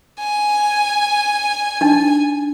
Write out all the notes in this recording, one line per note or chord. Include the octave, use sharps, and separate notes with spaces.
G#5
D4 D#4